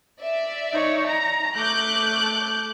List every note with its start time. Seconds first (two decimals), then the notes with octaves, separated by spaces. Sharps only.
0.21 D5 E5
0.73 D#4 C#5
1.06 A#5
1.56 A3 D6 F#6 G6